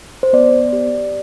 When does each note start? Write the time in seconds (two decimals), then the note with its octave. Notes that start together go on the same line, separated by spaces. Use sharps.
0.23 C5
0.33 B3 D5
0.73 G4